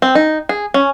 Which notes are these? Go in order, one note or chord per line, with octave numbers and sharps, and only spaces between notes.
C4
D#4
G#4
C#4